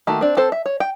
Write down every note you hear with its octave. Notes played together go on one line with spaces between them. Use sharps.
D#3 A3 A#3 F#4
C4 D4
C4 A4 C5
E5
C#5
G5